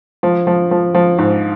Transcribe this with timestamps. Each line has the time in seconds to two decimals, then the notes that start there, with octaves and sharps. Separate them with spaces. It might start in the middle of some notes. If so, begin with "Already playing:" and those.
0.23 F3
0.47 F3
0.71 F3
0.94 F3
1.18 G#2